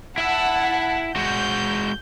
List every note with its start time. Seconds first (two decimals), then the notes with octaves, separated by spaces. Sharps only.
0.18 E4 E5 F#5 A5
1.16 G#3 F#4 G6